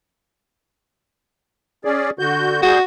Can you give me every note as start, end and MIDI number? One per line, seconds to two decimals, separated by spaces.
1.85 2.10 61
1.85 2.10 68
1.85 2.10 74
2.19 2.61 50
2.19 2.61 66
2.19 2.61 91
2.63 2.79 55
2.63 2.83 66
2.63 2.79 68
2.63 2.79 91